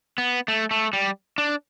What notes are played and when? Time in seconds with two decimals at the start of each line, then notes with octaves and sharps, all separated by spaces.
0.18 B3
0.48 A3
0.71 A3
0.93 G3
1.38 D4